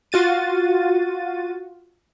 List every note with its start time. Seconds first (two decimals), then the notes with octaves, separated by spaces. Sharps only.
0.12 F4 F#4 A6 D#7